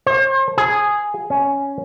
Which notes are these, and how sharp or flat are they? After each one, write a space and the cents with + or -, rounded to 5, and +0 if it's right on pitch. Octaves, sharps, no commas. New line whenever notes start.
C5 +40
G#4 +0
C#4 +5